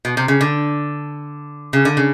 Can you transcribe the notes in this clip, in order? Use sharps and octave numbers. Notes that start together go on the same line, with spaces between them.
B2
C3
C#3
D3
C#3
D3
C#3